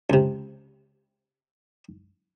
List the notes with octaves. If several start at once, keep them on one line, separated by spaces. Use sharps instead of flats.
C#2 C3